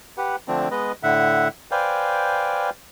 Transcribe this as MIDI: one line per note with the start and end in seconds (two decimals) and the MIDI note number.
0.18 0.36 67
0.18 0.36 71
0.18 0.36 78
0.48 0.69 50
0.48 0.69 53
0.48 0.69 57
0.48 0.69 60
0.48 0.69 62
0.71 0.92 56
0.71 0.92 59
0.71 0.92 71
0.71 0.92 75
1.03 1.48 45
1.03 1.48 50
1.03 1.48 76
1.03 1.48 78
1.71 2.70 71
1.71 2.70 72
1.71 2.70 74
1.71 2.70 77
1.71 2.70 79
1.71 2.70 80